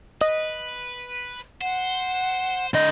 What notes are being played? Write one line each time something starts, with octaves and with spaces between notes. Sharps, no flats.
B4 D#5
C5 F#5
D3 D#5 G6